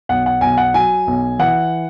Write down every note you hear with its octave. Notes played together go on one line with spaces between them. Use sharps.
B1 F#5
F#5
B1 G#5
F#5
F#3 G#5
B1
E3 F#5